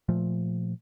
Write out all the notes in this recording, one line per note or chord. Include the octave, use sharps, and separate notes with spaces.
A#2 F3 A3